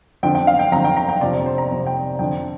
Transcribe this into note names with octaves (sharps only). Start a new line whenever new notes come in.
F2 D3 G5
G5
F5
G5
F2 D3 A#5
G5
A#5
G5
F2 C3 D5
D5
C5
A#5
F2 C3
G5
F2 D3 G5